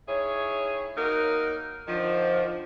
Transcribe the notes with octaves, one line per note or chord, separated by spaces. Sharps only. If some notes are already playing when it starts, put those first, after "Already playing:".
D#3 E4 G#4 C#5
F#3 A#3 D#4 A#4
D3 D#3 F3